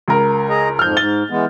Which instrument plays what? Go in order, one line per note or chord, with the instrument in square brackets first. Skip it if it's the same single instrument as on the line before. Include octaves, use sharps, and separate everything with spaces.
[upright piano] C#2 A#4
[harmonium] G#4 D#5 A#5
[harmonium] F2 G#2 F3 [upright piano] F6 G6
[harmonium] G#2 [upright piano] A6 G7
[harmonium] E3 G#3 B3